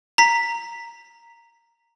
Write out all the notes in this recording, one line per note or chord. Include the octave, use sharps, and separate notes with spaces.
A#5 B6